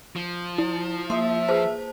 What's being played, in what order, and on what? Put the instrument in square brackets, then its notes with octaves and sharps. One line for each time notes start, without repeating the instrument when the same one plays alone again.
[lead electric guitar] F3
[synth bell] E4
[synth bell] A#3 [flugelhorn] E5 [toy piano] C6 D#6
[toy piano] F4 G#4 B4 [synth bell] C5 A5